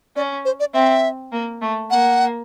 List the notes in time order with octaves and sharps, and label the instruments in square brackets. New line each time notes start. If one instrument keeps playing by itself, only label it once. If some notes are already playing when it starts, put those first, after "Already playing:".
[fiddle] C#4 [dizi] D5
[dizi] C5
D5
[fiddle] C4 [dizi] E5
[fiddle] A#3
A3
[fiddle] A#3 [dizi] F#5